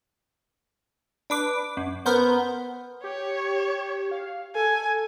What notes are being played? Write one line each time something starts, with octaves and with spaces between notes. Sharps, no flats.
D4 B4 D6
F#2
B3 A#4 C5 G6
G4 C#5
F5
A4 G#5